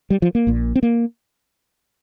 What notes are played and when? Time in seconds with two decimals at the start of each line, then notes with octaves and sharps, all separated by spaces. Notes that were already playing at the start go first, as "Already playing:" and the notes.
0.10 G3
0.22 F3
0.35 A#3
0.47 A#1 A#2
0.76 C4
0.83 A#3